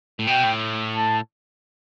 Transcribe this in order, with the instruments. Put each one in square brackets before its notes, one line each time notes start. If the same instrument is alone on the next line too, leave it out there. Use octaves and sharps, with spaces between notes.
[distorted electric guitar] A2
[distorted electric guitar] B2 [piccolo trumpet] G5
[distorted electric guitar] A2
[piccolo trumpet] A5